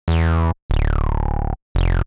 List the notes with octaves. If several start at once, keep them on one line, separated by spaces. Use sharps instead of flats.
E2
D1
F1